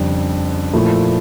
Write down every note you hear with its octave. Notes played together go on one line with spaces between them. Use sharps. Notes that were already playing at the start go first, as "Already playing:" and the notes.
Already playing: F2 C#3 G3 D4
A#2 F3 A3 E4